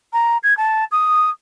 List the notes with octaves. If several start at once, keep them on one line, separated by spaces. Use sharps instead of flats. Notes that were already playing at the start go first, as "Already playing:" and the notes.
A#5
G#6
A5
D#6